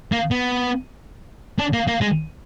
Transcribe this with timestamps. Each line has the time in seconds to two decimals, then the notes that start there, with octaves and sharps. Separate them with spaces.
0.12 A#3
0.31 B3
1.59 D4
1.73 A#3
1.88 A#3
2.01 G#3